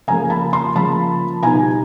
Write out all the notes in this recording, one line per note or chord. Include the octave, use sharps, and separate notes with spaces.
C#3 F3 A#3 G#5 A#5
A5 B5
A#5 C6
C#3 F3 A#3 A5 B5
B2 G3 B3 D#4 G#5 A#5